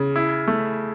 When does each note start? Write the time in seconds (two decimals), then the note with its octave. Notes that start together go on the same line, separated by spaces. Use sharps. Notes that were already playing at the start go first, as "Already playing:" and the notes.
Already playing: C#3
0.16 E4
0.47 A3